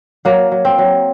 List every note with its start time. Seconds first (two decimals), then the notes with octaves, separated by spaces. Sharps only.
0.25 F#3 A#3
0.51 F#3
0.65 C4
0.78 F#3